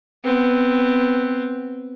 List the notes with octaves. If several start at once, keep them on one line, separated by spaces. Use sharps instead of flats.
B3 C4